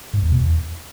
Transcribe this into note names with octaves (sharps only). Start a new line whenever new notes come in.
G#2
E2
B2
E2